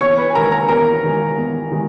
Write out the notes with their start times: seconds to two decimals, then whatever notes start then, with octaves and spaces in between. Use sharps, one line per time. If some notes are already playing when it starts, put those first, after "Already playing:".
0.01 E2 C#5 C#6
0.18 B4 B5
0.29 G#5
0.35 D#3 G#3 A#4 A#5
0.52 A#4 A#5
0.68 E2 A#4 A#5
1.03 D#3 G#3
1.37 E2
1.71 D#3 G#3